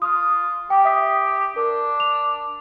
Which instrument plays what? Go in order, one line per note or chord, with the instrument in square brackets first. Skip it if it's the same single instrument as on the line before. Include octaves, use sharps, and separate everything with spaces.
[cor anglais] F4 [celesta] D#6 F6
[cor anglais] G4 [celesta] G5
[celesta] E5 D#6 B6
[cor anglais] D4 [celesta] A#4
[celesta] F7